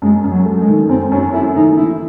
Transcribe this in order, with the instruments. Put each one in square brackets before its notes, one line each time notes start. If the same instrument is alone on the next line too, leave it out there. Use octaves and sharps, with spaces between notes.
[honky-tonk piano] F#2 [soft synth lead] G#3
[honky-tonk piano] F#2
[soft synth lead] F#3
[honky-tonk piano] A3
[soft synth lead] G#3
[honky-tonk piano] D#3
[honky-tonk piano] F#2 [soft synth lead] C4
[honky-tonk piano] F#2 [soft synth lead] C#4
[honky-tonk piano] A3 [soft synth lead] E4
[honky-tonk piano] D#3 [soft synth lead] D#4
[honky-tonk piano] E3 [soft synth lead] E4